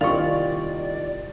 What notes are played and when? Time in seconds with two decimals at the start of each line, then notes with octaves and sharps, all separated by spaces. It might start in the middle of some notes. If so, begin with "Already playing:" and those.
0.01 C2 A#2 D#3 D5 F5 C6 C#6